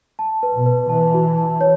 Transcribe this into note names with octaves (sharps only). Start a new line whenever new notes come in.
A5
B4
B2
B4
E3 A5
F#4
A5
C#5